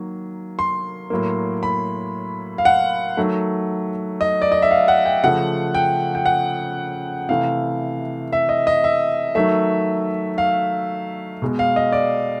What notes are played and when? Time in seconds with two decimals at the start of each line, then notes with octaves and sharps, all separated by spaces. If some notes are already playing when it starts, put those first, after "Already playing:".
Already playing: D#3 F#3 A#3
0.59 C6
1.10 A2 F#3 A#3
1.63 B5
2.58 F5
2.65 F#5
3.17 D#3 F#3 A3
4.21 D#5
4.42 D5
4.52 D#5
4.62 E5
4.71 F5
4.88 F#5
5.05 G5
5.24 C#3 F3 A3 F#5
5.75 G5
6.15 G5
6.26 F#5
7.29 C3 E3 A3 F5
8.33 E5
8.49 D#5
8.67 D#5
8.84 E5
9.35 D#3 F#3 A3 E5
10.38 F5
11.42 B2 G#3
11.59 F5
11.76 D#5
11.92 D5